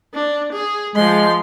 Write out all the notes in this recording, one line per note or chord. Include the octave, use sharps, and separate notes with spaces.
D4
G#4
F3 G#3 C6